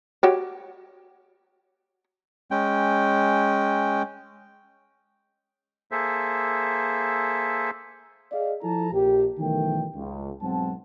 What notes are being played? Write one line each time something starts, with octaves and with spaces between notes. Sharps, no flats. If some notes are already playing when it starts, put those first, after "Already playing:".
F#4 G4 C#5
G#3 C#4 G5
A#3 G#4 A4 C5 E5
G#4 D5 D#5 F5
F3 E4 F4 A4 A5 A#5
A#1 G4
B1 D#3 E3 A3 A#4 G5
C#2
B1 G#2 F#3 C4 F#5 A5